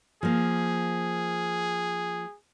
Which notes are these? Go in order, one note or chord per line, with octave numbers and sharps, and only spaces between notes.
F3 A#3 G#4